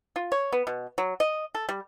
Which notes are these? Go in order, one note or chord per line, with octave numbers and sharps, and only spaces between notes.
F4
C#5
B3
B2
F#3
D#5
A4
G3